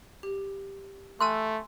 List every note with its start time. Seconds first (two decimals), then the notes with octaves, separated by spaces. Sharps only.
0.23 G4
1.21 A3 G#5 C6 E6 F#6